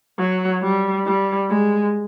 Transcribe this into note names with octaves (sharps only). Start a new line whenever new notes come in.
F#3
G3
G3
G#3